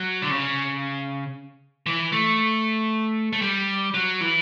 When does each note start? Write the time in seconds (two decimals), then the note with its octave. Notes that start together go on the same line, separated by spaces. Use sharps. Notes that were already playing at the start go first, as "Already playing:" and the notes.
Already playing: F#3
0.22 D3
0.30 C#3
1.86 E3
2.12 A3
3.33 A3
3.42 G3
3.94 F#3
4.21 E3